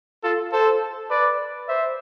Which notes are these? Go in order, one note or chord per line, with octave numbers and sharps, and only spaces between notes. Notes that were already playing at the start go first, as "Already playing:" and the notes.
F4 A4
A4 C5
B4 D5
C5 E5